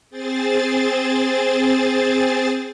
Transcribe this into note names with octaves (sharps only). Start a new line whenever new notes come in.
C4 G#4 C5 A6